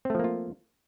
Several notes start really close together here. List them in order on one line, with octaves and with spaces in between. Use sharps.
C4 A3 F3 A#3 F4